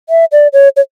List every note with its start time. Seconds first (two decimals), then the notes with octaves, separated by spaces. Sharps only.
0.09 E5
0.32 D5
0.53 C#5
0.76 C#5